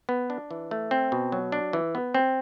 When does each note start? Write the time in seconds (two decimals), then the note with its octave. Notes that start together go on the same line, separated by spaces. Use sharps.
0.09 B3
0.30 D4
0.51 E3
0.71 A3
0.91 C4
1.12 B2
1.32 F#3
1.52 D4
1.73 E3
1.95 B3
2.14 C4